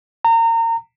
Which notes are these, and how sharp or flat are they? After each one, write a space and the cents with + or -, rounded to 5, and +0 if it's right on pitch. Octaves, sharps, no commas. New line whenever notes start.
A#5 -30